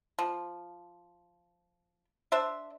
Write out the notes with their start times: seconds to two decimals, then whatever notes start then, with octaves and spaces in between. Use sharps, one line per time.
0.19 F3
2.32 D4 C5 E5